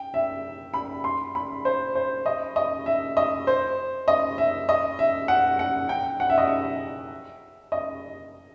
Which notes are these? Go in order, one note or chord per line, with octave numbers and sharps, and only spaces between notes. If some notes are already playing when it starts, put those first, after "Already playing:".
Already playing: G5
E5
B5
C6
B5
C5
C5
D#5
D#5
E5
D#5
C5
D#5
E5
D#5
E5
F#5
F#5
G5
F#5
E5
D#5
E5
D#5